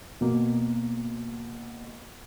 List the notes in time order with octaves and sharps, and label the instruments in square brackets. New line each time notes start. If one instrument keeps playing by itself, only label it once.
[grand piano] B2 A#3